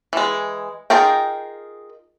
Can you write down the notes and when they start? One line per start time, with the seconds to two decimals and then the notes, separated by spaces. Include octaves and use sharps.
0.13 E3 G#3
0.90 D#4 F4 G#4 A#4 G5